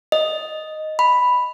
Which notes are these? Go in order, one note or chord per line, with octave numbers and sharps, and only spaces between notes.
D#5
B5